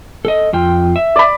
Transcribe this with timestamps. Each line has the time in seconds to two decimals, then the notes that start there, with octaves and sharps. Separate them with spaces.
0.25 A4 D#5
0.53 F2 F4 G5
0.96 E5
1.16 D5 B5